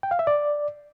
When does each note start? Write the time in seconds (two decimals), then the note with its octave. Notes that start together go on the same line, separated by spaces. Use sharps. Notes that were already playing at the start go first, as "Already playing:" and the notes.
0.03 G5
0.11 F5
0.19 E5
0.27 D5